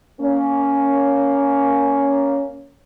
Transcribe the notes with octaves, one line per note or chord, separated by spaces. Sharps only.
A#3 C#4